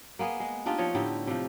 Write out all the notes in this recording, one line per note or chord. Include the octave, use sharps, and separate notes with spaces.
A#3 B3 G#4 D#5
G#3
D4 D#4 F4 G4
F3 C#5 D#5
A2 D3 D#4 G4
C3 F3